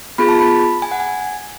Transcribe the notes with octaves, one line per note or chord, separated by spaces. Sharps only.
B3 F4 G#4 B5
A5
B5
G#5
F#5
G#5